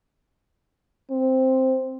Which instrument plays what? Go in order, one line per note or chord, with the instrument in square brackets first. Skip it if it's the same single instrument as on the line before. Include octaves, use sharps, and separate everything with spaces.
[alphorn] C4